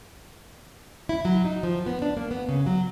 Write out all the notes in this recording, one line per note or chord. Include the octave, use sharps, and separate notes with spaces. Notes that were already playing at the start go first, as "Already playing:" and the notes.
E4
F#3
D#4
F3
B3
D4
A#3
B3
C#3
F#3